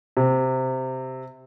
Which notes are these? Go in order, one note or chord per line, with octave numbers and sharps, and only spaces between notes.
C3